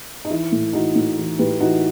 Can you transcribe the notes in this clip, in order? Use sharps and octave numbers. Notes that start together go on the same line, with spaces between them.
D#4
E3 E4
A2
E3 D#4 F#4
A2
E3
A2 G4 B4
E3 D#4 F#4